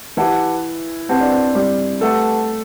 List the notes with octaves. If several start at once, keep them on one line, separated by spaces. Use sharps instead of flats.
E3 E4 G4 B4 F#5 A5
C4 G4 B4 F#5 A5
D4
C4
G3 G4
A3 G4 A4 B4 F#5 A5